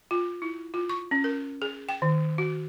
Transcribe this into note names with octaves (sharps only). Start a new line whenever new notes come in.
F4
E4
F4
C#6
C#4
A#4
G#4
G5
D#3
F#4